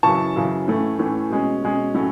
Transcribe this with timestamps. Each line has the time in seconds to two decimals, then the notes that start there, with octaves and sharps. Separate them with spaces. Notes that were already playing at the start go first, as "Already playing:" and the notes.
0.03 F#2 C#3 E3 A5 C#6
0.36 F#2 C#3 E3
0.68 A2 E3 A3 C#4
0.99 A2 E3 A3 C#4
1.30 B2 G#3 C#4
1.63 B2 G#3 C#4
1.94 A2 F#3 A3 C#4